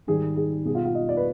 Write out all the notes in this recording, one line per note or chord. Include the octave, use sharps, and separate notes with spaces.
G#2 D#3 G3 G#4
G#4
B2 G3 G#4
F4
F4
D#5
D5
B4